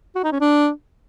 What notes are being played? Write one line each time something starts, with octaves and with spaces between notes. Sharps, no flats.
F#4
D#4
C#4
D4